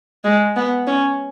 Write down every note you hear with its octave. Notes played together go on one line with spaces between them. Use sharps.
G#3
B3
C#4